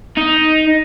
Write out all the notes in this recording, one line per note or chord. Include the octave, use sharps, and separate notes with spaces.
D#4